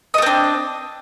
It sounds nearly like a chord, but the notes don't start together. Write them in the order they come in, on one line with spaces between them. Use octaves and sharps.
D#5 A3 C4 D4